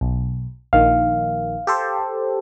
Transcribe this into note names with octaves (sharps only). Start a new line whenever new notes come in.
B1
A#1 D#3 F5
G4 A4 C5